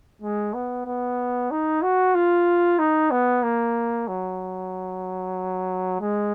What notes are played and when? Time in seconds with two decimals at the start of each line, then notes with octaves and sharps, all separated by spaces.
0.22 G#3
0.54 B3
0.86 B3
1.51 D#4
1.82 F#4
2.15 F4
2.79 D#4
3.11 B3
3.43 A#3
4.08 F#3
6.01 G#3